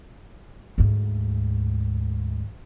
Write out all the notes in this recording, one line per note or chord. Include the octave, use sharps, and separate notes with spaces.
D2 G#2